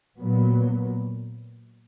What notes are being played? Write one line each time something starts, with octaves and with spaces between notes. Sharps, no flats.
A#2 F#3 B3